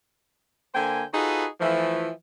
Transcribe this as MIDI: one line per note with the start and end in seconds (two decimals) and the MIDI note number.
0.74 1.04 50
0.74 1.04 58
0.74 1.04 72
0.74 1.04 79
0.74 1.04 80
1.14 1.45 63
1.14 1.45 65
1.14 1.45 66
1.14 1.45 68
1.14 1.45 69
1.14 1.45 71
1.60 2.09 52
1.60 2.09 53
1.60 2.09 57